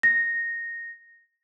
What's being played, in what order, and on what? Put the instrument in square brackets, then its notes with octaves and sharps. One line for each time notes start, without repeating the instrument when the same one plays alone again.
[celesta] A#6